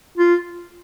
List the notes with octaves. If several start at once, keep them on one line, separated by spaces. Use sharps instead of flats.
F4